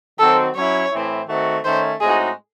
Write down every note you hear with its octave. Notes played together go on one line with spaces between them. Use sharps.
D#3 F#3 C4 F#4 A4
F#3 C#4 E4 C#5
A2 E3 C4 E4
D#3 A3 C4 F#4
D#3 A3 C#4 C5
A2 G#3 C4 D#4 F#4 G#4